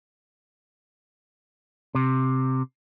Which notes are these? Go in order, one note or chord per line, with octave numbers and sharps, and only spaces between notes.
C3